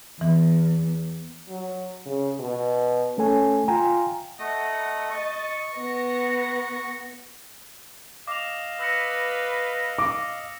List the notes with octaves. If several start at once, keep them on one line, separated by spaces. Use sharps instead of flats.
E2 E3
F#3
C#3
B2
A3 C#4 A4 G#5
F4 G5 G#5 A#5
A3 D#5 F#5 A#5 D#6
D#5 C#6 A6
B3 A#6 C#7
D#5 F5 D6 F7
B4 E6 A#6 C#7
D6